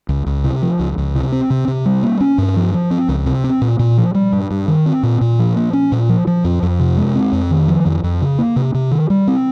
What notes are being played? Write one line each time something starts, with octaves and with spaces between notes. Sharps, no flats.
C#2
C#2
C3
F3
C#2
C#2
C3
C4
C3
C3
G3
A#3
C#4
G2
F3
F3
C4
C#2
C3
C4
A#2
A#2
F3
G3
G2
G2
D#3
C4
A#2
A#2
F3
A#3
C#4
A#2
F3
F3
F2
F2
C3
G#3
C4
F2
D#3
F3
F2
F2
C#3
A#3
C3
C3
D#3
G3
C4